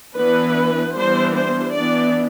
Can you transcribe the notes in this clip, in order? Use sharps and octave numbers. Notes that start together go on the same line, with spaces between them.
E3 B3 D4 B4
E3 G3 B3 D4 C5
C5
E3 B3 D4 D5